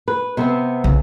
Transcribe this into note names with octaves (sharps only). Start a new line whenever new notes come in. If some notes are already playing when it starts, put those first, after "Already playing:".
B4
C3 B3 C4
B1 C#3